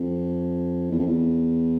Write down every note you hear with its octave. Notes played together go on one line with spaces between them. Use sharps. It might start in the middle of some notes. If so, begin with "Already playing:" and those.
Already playing: F2
E2
F2
E2